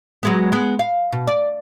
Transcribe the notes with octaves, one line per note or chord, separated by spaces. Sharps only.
F#3 G#3 B3
G#3 B3
F5
B2
D5